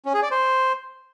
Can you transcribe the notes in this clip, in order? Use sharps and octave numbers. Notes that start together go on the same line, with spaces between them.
C#4
G#4
D5
C5